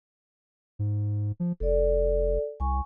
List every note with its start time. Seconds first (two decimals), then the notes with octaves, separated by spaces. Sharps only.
0.79 G#2
1.40 F3
1.60 F1 A4 D5
2.60 C2 G#5 C#6